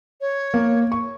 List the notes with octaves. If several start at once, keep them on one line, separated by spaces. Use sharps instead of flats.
C#5
A#3
C#6